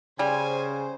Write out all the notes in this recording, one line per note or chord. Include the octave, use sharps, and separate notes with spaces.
C#3 G3 C5 G#5